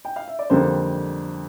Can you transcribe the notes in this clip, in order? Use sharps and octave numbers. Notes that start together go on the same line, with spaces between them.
G5
F5
E5
D5
F2 D3 G3 A#3 C5